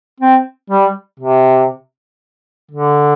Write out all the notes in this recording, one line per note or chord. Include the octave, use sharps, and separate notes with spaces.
C4
G3
C3
D3